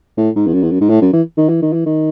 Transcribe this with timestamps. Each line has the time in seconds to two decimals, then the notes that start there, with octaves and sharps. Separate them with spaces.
0.17 A2
0.36 G#2
0.46 E2
0.53 F#2
0.63 E2
0.71 F#2
0.81 G#2
0.89 A2
1.02 F#2
1.13 E3
1.37 D#3
1.49 E3
1.62 D#3
1.73 E3
1.86 D#3